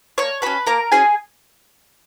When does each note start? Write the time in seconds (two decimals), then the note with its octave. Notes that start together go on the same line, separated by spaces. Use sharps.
0.18 A#3 C#5 C#6
0.42 C#4 F#4 B4 B5
0.67 A#3 A#4 A#5
0.92 C#4 F#4 G#4 G#5